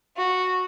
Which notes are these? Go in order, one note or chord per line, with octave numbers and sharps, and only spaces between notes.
F#4